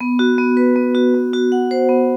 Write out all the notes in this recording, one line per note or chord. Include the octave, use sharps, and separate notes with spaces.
B3
F#4
B3
B4
B3
F#4
B3
F#4
F#5
C5
B3